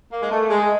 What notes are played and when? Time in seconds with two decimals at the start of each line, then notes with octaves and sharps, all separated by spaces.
0.11 A#3
0.21 G#3
0.31 A3
0.49 G#3